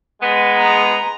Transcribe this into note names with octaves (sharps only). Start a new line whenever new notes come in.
G#3 B3
A#5